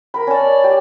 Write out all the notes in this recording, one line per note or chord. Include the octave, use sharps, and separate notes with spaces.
A#4 B5
C#4 D5 A5
G4